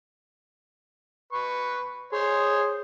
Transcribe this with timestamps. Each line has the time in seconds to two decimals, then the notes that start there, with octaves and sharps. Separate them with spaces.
1.32 B4 C#6
2.13 G#4 C5 C#5 C6